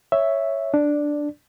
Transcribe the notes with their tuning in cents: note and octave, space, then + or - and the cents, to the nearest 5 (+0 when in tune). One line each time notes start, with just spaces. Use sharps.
C#5 +0 E5 +0
D4 +0 D5 +0